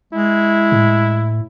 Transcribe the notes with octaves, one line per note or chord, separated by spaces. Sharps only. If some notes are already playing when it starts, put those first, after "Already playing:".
G#3 E4
A2